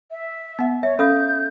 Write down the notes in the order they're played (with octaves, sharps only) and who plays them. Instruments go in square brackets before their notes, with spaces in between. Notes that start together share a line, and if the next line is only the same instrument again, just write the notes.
[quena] E5
[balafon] B3 F#5
[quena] C#5 [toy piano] E5
[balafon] C#4 [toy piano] A4 F5 D#6 [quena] G6